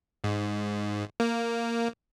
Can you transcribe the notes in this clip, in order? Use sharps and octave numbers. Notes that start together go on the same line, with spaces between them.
G#2
A#3